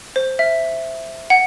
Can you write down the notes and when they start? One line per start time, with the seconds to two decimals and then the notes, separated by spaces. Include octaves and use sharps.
0.16 C5
0.39 E5
1.30 F#5